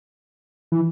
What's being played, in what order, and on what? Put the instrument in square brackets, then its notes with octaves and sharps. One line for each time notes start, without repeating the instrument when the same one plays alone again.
[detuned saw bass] E3